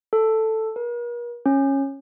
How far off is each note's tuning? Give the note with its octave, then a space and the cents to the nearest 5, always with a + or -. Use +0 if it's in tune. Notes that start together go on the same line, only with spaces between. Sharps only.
A4 +5
A#4 +45
C#4 -15